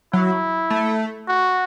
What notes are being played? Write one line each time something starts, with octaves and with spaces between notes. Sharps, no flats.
F#3 E4
A3
F#4